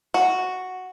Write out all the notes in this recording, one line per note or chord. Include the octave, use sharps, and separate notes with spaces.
F#4